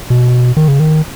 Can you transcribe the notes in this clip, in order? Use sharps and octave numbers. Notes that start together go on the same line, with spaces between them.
B2
D#3
C#3
D#3